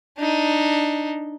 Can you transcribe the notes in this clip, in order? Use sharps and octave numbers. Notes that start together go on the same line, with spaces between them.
D4 D#4